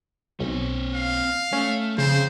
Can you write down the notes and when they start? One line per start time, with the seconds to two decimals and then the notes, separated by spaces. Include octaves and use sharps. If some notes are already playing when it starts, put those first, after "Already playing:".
0.40 B1 C4 C#5
0.95 F5
1.53 A3 C#4
1.98 F2 C#3 C5